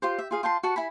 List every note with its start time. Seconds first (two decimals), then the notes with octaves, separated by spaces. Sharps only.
0.02 F4 G4 C5
0.18 E5
0.31 F4 G#4 F5
0.43 F4 G5 A5 C6
0.63 F#4 F#5 A5
0.76 E4 G#5 B5